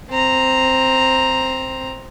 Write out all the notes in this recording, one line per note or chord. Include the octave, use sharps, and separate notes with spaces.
C4 A#5